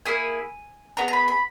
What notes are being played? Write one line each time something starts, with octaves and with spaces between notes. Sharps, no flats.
A#3 E4 G#4 G#5
B3 E4 G#4 A#5
A#5
B5
B5